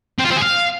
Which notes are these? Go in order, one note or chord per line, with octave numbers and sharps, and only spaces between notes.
C4
F4
C4
G#4
F5